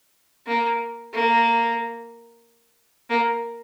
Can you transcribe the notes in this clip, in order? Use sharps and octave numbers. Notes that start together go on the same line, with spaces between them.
A#3
A#3
A#3